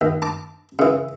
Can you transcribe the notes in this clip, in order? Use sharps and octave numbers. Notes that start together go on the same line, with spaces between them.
D#2
A5 D6
C#3 E3